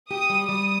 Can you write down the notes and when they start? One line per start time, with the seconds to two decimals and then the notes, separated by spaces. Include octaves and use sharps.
0.11 G4 D#6
0.30 G3
0.49 G3 D#6